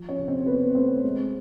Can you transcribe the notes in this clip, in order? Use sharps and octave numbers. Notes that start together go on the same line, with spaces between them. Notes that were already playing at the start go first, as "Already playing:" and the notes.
Already playing: F3
C#4 C#5
C3
C4 C5
C3 B3 B4
A3 C4 C5
G#3